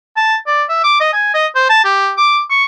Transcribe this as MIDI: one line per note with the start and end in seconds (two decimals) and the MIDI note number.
0.17 0.36 81
0.47 0.63 74
0.69 0.80 76
0.83 0.97 86
1.00 1.10 75
1.13 1.33 80
1.34 1.47 75
1.55 1.66 72
1.69 1.83 81
1.84 2.12 67
2.17 2.40 86
2.50 2.64 85